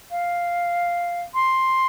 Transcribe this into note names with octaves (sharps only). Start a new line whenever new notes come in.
F5
C6